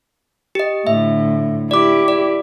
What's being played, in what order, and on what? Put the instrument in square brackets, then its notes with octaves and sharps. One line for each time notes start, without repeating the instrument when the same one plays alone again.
[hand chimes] G4 D#5
[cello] A2 D3 [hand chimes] E5
[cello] E4 G4 [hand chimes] D5 D6
[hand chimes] D5